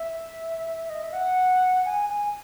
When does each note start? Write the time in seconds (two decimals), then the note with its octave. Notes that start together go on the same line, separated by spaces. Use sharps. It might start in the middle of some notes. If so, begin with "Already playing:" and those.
Already playing: E5
0.90 D#5
1.03 E5
1.13 F#5
1.85 G#5
2.09 G#5